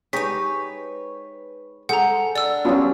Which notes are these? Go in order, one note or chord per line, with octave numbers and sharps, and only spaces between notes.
G#3 D#4 G4 B4 C#5 B6
G#3 A4 C5 F#5 A#5
D4 D5 E6
F#3 G3 B3 C#4 F4